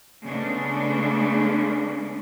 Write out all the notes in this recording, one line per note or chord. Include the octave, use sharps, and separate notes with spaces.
C#3 G#3 A3 B3 C#4 D4